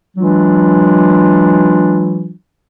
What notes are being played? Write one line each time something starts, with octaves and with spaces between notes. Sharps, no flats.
E3 F#3 G#3 D4 F4